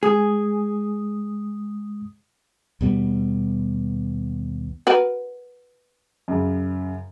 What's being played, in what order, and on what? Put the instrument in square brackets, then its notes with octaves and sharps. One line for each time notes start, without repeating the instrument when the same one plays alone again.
[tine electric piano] G#3 D#6 [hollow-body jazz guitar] G#4
[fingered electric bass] D#2 B2 G3 B3
[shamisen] F#4 A#4 B4
[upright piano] F#2 C#3